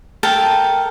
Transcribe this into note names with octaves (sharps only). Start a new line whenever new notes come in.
A4 A#4 G5 A5